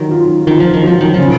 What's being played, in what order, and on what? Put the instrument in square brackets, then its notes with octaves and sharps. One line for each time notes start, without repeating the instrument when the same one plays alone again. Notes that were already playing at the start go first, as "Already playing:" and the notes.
Already playing: [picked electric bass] D#3 [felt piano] F#3
[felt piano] F4
[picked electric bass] D#3 [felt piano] F4
[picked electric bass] F3
D#3
[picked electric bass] F3 [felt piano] F#3
[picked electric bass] D#3
[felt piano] C#3 [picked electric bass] F3